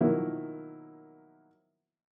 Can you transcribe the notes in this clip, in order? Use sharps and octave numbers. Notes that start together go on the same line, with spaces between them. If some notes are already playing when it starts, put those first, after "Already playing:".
B2 D#3 F3 F#3 A#3 E4